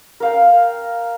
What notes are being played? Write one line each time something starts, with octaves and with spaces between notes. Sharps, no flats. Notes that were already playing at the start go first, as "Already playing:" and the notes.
A#4 F5 G5